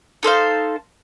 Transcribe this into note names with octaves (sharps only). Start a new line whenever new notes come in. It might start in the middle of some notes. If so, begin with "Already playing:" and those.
D#4 A4 C5 F5